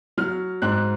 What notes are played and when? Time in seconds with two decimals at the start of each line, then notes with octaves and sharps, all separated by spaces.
0.17 F#3 F6
0.62 G#2 F#6